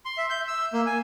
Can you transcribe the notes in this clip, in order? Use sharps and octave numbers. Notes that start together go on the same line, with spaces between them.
C6
E5
G6
E6
A#3
G#5